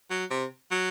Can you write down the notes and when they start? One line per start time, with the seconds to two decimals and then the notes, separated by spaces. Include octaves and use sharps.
0.10 F#3
0.31 C3
0.71 F#3